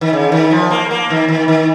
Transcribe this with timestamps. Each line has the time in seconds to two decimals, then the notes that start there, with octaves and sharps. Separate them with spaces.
0.01 D#3
0.13 C#3
0.32 D#3
0.51 F3
0.70 A#3
0.91 A#3
1.10 D#3
1.28 D#3
1.48 D#3